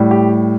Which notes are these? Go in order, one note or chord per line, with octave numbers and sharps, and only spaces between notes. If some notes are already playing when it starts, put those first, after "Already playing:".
Already playing: A2 G3
G4